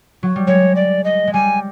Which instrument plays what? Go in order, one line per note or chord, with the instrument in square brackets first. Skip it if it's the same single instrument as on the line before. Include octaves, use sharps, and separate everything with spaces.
[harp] F#3
G3
[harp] G#3 [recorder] C#5
[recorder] D5
D#5
[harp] G#3
[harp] G3 [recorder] G#5